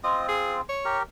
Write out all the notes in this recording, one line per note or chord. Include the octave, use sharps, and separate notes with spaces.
C4 F4 D#5
G#4
C#5
G4 A#4